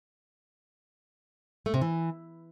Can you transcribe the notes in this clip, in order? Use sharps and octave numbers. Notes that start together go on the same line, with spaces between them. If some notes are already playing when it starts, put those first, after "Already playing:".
A3
C3
E3